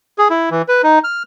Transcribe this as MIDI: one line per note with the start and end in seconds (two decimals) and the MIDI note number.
0.18 0.28 68
0.30 0.49 64
0.51 0.62 52
0.68 0.82 71
0.83 0.99 63
1.04 1.23 89